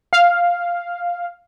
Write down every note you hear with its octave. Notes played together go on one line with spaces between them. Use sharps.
F5